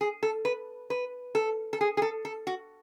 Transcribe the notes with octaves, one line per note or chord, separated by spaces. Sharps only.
G#4
A4
B4
B4
A4
A4
G#4
G#4
A4
A4
F#4